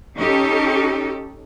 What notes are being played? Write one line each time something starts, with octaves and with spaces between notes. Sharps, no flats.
C#4 D#4 G4 A4